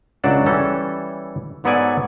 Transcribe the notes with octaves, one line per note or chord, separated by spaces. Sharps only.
C#2 F#3 D4 F#5 A5
E3 G3 C#4 A4
G#2 F#3 B3 A4 D5 G#5